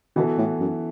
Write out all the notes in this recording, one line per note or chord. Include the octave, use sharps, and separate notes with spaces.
B2 E3 B3 F#4 A4
A2
F#2